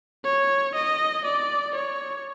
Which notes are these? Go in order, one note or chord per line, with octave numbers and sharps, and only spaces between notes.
C#5
D#5
D5
C#5